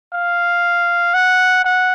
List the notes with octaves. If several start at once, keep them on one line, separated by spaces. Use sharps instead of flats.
F5
F#5
F#5